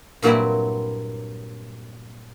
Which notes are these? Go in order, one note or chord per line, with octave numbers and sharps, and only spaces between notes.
G2 A#2 F#3 C4 E4 G4